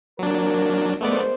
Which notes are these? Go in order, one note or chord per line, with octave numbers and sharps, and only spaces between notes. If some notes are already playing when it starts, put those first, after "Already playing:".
F#3 A#3 C4 D4 A#4
G#3 A3 B3 A#4 C5 D5